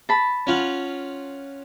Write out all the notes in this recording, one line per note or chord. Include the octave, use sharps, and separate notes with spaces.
A5 B5
C#4 F4 F#5